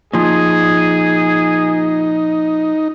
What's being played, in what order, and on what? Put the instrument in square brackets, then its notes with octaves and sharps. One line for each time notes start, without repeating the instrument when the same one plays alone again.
[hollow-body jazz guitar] A#2 F3 [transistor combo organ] D#4 [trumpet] G#4